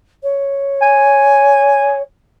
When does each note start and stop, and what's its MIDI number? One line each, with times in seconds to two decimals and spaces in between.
0.23 2.02 73
0.82 1.97 80